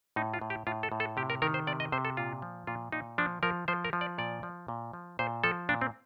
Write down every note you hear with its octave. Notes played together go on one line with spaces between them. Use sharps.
A2 D#4
F4
A2
G4
A2 F4
A4
A2
A4
C3 G4
A#4
D#3 A#4
C5
C3 D5
D#5
C3 C5
A4
A#2 F4
F3
A#2 F4
A#2 D#4
F3 D4
F3 A#4
F3 C5
A#4
F3
D5
A#2 D5
F3
A#2
F3
A#2 C5
F3 A4
A#2 D4
C4